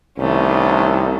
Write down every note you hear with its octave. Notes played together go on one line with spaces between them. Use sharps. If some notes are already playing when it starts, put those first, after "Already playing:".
C2 D#3 A3 C#4